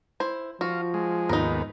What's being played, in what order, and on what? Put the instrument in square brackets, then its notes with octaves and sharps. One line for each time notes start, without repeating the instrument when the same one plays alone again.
[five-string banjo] E4 C5
[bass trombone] F3 [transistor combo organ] F4 [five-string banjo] F#4
[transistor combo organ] G#3
[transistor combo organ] D#2 G#2 B3 [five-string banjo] D#4 A#4